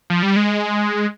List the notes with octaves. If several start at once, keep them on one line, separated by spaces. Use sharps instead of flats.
F3
G3
G#3